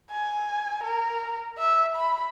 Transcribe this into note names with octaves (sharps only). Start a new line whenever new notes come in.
G#5
A#4
E5
B5